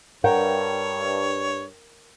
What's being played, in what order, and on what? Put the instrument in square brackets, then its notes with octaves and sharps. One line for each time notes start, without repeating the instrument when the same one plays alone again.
[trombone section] G2 [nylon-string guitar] A#4 F#5 G5 [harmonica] C#5